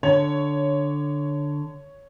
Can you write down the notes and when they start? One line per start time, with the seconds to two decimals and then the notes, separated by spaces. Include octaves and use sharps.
0.03 D3 C#5